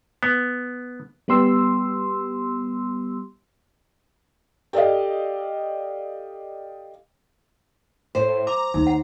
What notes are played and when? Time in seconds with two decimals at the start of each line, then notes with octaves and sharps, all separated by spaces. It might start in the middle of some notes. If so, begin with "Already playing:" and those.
0.23 B3
1.28 G3 B3 G4 C6 E6
4.73 G4 A4 D5 D#5 F5
8.15 A2 C5
8.47 A#5 D6
8.74 D#2 D#4
8.87 F#5